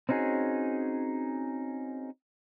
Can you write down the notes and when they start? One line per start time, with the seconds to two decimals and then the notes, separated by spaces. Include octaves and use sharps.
0.09 C4 C#4 D#4 F#4 G#4